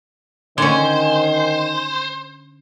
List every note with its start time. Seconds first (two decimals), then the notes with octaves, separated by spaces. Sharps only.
0.58 D3 D#3 C#4 C5 G#5